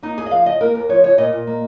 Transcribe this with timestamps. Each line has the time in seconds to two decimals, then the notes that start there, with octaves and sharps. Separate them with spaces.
0.03 A#3 D#4
0.17 D#2 G#4
0.26 D#5
0.31 F3 F5
0.46 C#3 D#5
0.61 A#3 A#4
0.74 D#2 A#4
0.89 F3 C#5
1.04 C#3 C#5
1.18 A#2 D#5
1.32 A#2
1.47 A#3